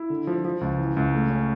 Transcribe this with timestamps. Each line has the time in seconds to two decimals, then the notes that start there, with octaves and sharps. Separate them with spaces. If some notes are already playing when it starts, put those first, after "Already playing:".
Already playing: E4
0.10 D3
0.27 F3
0.45 F3
0.61 C#2
0.78 E3
0.97 C#2
1.14 A3
1.30 C#4